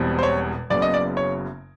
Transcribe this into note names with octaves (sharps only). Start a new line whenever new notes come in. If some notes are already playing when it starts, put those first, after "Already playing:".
Already playing: E1 E2 B2 G3 C4
C5
C#5
F#1 F#2 C#3 F#3 B3 D5
D#5
D5
C#5